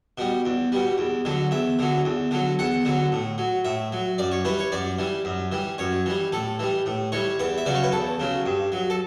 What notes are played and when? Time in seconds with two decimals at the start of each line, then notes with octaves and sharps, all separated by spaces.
0.18 B2 G3
0.45 E2
0.72 B2 G3
0.98 E2
1.25 D3 F#3
1.51 E2 E5
1.79 D3 F#3
2.05 E2
2.31 D3 F#3
2.59 E2 F#5
2.85 D3 F#3
3.12 A2
3.38 F#3
3.65 A2 E5
3.92 F#3
4.18 F#2 D5
4.32 C#5
4.45 E3 G3 B4
4.59 C#5
4.72 F#2 D5
4.99 E3 G3
5.25 F#2
5.52 E3 G3
5.78 F#2 C#5
6.06 E3 G3
6.32 A2 A4
6.59 E3 G3
6.86 A2
7.12 E3 G3 C#5
7.40 E2 B4
7.58 E5
7.66 C#3 F#3 D5
7.75 C#5
7.83 B4
7.92 E2 A4
8.20 C#3 F#3
8.46 G2
8.72 F#3
8.90 A4